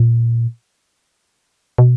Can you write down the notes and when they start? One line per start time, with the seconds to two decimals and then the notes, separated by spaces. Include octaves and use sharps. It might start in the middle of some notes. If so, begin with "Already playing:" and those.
Already playing: A#2
1.78 B2